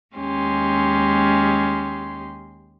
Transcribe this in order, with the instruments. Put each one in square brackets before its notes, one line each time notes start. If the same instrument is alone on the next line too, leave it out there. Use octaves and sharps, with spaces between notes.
[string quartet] D#2 G#3 C#4 G4 C6